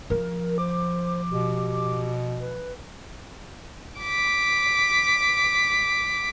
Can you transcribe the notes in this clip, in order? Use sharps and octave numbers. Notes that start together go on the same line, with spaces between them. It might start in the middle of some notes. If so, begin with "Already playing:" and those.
F3 A#4
C5 D6
B2 G4
B4
D6 B6